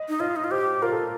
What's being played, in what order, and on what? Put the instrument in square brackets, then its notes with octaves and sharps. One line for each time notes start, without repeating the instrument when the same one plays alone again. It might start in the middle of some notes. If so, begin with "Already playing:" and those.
Already playing: [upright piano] D#5
[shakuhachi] D#4
[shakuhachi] F4 [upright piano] D#5
[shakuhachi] D#4
F4
[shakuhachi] G4 [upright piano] C5
[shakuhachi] F4 [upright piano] A#4
[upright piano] A4